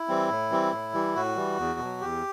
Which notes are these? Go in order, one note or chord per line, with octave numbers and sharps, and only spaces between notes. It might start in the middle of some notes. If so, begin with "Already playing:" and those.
Already playing: E4
E3 G3 C4
A2
E3 G3 C4
A2
E3 G3
A2 F#4
E3 G3
E2
B2 F#3
E2 G4